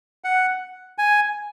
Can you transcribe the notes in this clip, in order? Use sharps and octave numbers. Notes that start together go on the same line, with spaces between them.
F#5
G#5